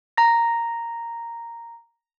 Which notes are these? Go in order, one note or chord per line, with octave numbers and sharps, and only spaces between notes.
A#5 A#6